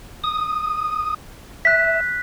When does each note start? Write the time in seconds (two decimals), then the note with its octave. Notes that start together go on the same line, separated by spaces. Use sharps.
0.24 D#6
1.65 E5 F#6 B6